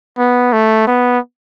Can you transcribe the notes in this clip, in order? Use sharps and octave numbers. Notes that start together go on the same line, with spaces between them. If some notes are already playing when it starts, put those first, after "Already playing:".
B3
A3
B3